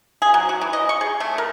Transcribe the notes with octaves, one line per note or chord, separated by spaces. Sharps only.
G#4
F#3
F#4
E3
D#5
C#6
G#4
A3
A#4